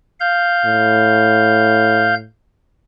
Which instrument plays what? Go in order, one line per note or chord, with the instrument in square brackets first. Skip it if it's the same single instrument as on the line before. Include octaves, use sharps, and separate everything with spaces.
[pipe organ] F5 G6
[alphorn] A2